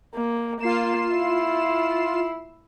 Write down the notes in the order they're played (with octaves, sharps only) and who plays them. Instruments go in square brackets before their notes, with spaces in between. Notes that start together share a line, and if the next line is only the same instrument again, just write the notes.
[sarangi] A#3
[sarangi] A#3 [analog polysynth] F4 C7 E7
[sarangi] E4